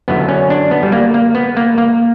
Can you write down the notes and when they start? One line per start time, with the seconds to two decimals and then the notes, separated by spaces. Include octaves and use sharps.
0.08 F#2 D3 F#3 B3
0.29 C#4
0.50 D4
0.71 B3
0.83 G3
0.92 A#3
1.14 A#3
1.35 B3
1.57 A#3
1.78 A#3